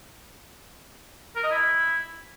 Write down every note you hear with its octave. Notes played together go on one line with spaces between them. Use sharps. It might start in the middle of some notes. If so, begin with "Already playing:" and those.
A#4
D#5
E4